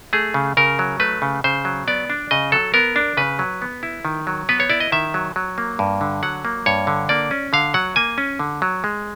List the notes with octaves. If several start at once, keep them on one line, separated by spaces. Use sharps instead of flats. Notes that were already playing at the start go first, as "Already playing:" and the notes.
A3 G#4
C#3
C#3 A#4
F#3
A3 B4
C#3
C#3 C5
F#3
B3 D5
D4
C#3 D#5
F#3 A4
B3 A#4
D4
C#3 B4
F#3
B3
E4
D#3
F#3
B3 B4
C#5
E4 D5
D#5
D#3 E5
F#3
F#3
A#3
G2
D3
F#3 F#5
A#3
G2 C#5
D3
A#3 D5
C#4
D3 F5
F#3 F#5
A#3 G#5
C#4
D3
F#3
G#3